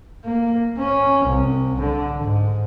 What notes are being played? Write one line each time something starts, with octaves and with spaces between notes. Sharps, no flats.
A#3
C#4
C2
D3
G#2